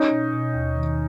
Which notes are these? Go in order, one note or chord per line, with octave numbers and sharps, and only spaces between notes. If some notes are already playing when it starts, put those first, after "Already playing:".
Already playing: C#4 D#4
B2
B2
D#2
D#3